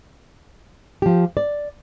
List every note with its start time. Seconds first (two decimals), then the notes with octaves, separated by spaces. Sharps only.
1.02 F3 G4
1.37 D5